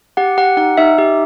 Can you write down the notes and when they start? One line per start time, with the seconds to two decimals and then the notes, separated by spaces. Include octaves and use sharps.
0.17 G4 F#5
0.38 G4 F#5
0.57 D#4 F#5
0.78 D#4 E5
0.98 G4